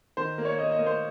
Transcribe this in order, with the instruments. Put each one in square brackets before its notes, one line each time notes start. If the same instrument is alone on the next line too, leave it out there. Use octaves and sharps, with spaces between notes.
[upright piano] D#3 C5
A#3
C#5
A#3 D#5
D#5
A#3
C5